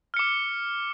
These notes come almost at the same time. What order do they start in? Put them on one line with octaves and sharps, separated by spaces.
F6 C#7 D6